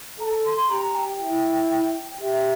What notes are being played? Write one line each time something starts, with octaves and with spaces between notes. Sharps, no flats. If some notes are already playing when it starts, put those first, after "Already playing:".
A4 A5 A#5
C6
G4 A#5
G5
E4
G4 E5